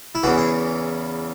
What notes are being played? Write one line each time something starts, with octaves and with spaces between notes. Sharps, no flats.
E4
E2 C#3 E3 F#4
G#4